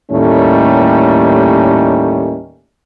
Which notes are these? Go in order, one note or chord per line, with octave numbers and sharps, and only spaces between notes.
D#2 A2 D#3 G3 A3 C#4